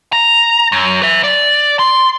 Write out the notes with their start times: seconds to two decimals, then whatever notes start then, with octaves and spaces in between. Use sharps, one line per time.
0.13 A#5
0.72 F#2
1.02 B4 E5
1.23 D5
1.79 C6